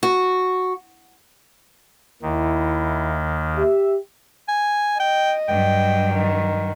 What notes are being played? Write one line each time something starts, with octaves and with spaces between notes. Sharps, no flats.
F#4
D#2 D#3 E4
G4 E5
G#5
D#5 G5
G2 F#3 G5
D#3